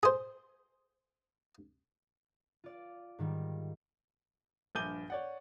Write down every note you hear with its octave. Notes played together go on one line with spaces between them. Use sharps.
G#4 C5
F4 D5
G#2 D#3 G3
A#1 G2 D6 G6 D#7 G7
C#5 D5 F#5